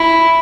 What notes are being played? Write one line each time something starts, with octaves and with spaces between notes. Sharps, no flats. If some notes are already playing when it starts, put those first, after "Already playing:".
Already playing: E4